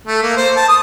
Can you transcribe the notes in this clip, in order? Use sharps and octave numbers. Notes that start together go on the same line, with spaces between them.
A3
A#3
C5
A5
D#6